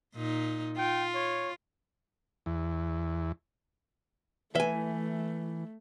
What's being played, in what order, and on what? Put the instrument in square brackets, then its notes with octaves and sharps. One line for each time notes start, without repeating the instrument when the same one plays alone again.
[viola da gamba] A#2 D#4
[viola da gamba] F4 [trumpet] G5
[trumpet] C#5
[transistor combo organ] E2
[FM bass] E3 [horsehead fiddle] A3 [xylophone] B4 [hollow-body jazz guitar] E5 G#5